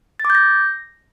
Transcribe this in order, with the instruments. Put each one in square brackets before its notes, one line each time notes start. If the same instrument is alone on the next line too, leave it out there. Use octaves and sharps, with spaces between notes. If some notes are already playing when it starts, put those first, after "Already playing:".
[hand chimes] A6
D6
G6
A#6